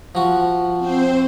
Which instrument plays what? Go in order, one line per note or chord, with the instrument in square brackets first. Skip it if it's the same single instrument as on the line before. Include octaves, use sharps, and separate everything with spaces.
[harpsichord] F3 F#4
[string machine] C4 C5